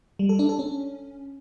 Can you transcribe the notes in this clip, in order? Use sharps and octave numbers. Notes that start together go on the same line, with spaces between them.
G3
A4
D4
A4
C#4